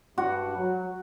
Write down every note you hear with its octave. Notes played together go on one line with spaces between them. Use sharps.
G2 F#4
F#3